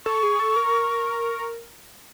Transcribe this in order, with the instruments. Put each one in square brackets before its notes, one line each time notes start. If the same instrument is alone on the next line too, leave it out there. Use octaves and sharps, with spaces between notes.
[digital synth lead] A4 [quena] C#6
[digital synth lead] G#4
A4
A#4